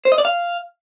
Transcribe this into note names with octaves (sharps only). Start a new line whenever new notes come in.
C5
D#5
D5
F5